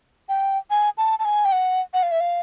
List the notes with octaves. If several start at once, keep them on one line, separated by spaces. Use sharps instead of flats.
G5
G#5
A5
A5
G#5
G5
F#5
F#5
F5
E5
F5